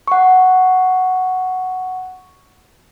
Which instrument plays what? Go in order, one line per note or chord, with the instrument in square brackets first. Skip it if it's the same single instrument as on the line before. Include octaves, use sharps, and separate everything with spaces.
[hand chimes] F#5 C#6